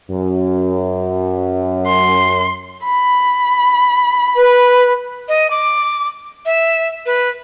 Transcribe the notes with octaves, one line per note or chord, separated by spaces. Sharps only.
F#2
C6
B5
B4
D#5
D6
E5
B4